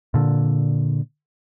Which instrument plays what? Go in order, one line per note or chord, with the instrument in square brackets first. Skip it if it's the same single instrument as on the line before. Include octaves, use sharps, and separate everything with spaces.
[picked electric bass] A#2 D3